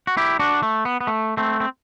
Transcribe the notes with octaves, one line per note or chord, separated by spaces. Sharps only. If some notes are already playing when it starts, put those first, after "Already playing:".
F#4
E4 G4
D4 F#4
A3
B3
B3
A3
A3 C4
C4